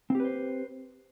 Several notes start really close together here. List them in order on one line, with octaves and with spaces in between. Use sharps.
C4 G4 B4 C5